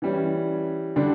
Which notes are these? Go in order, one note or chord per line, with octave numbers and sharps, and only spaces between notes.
E3 G3 C#4
D3 G3 D4